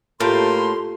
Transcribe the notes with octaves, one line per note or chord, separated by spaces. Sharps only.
A2 A#3 F4 G4 C6